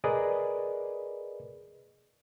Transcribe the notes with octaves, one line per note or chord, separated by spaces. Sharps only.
G#4 A#4 B4 D5 D#5